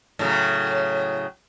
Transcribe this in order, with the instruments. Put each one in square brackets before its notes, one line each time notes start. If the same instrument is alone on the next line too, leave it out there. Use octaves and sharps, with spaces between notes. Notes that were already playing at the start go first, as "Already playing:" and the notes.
[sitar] A2 C#3 F#3